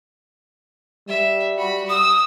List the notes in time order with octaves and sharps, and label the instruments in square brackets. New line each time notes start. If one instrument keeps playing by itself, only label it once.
[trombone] G3 [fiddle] E5
[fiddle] F#4 B5
[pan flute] D#6 [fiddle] E6